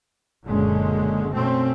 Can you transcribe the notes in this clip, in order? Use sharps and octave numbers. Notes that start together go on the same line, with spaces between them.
F#1 F#2 A#2 D3 G#3 C#4
B2 A3 C4 C#4